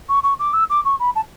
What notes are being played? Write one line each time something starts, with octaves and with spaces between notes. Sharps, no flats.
C#6
C#6
D6
E6
D6
C#6
B5
A5